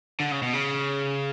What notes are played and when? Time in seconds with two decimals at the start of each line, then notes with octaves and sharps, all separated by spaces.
0.20 D3
0.31 C#3
0.42 B2
0.53 C#3